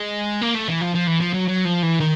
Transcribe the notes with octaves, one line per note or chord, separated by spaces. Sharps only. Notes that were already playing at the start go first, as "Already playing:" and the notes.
Already playing: G#3
A#3
A3
E3
F3
F3
E3
F3
F#3
F#3
F3
E3
D#3